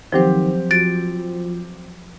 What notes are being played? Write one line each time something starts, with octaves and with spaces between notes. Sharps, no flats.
D#3 F3 F#3 C4 G4 C5
F3 F#4 A6 D7